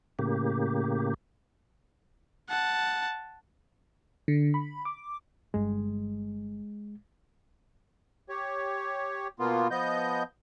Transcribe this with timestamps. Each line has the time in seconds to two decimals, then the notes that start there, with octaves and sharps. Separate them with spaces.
0.19 A2 C#3 A#3 G4
2.50 F#5 A5
4.28 D3
4.54 B5
4.85 D6
5.54 G1 G2 G#3
8.29 G4 C#5
9.39 B2 A#3 B3 F4
9.71 F3 B3 D#5 G6